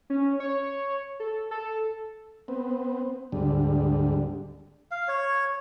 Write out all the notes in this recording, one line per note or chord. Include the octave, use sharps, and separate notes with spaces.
C#4
C#5
A4
A4
B3 C4
D2 G#2 D3 G3
F5
C#5